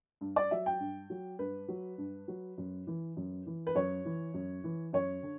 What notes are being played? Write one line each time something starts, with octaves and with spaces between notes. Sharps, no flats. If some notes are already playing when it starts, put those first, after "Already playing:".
G2
D5
F#3 E5
G5
G2
F#3
G2 B4
F#3
G2
F#3
F#2
E3
F#2
E3
B4
F#2 C#5
E3
F#2
E3
F#2 C#5
D3